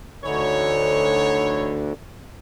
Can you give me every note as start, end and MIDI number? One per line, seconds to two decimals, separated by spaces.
0.24 1.93 38
0.24 1.93 50
0.24 1.76 52
0.24 1.76 63
0.24 1.76 73